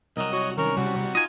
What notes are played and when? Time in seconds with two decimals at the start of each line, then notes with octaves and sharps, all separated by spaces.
0.17 C2 F#3 A#4 D#5
0.33 F#4 C#5 C#6
0.58 D#3 C#4 A#4 C#6
0.77 C3 G3 F#4
1.15 D#4 F4 D#5 G#5